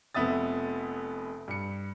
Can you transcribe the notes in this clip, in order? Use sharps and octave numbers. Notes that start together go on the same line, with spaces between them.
F1 F2 B3 E5 D#6 A6
G2 C#7